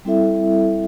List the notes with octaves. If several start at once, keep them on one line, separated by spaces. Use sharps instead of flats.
G3 C4 E4 A4 E5